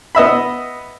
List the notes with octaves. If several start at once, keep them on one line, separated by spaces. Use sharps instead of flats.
B3 D#5 E5 B5